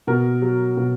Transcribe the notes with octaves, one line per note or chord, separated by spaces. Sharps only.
B2 A#4
F#3
B2